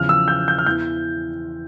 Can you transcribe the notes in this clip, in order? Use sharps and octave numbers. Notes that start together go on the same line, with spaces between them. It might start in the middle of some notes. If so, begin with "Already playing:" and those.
Already playing: E2 C#3 F3 F6
E6
G6
G6
F6
E2 E3 G6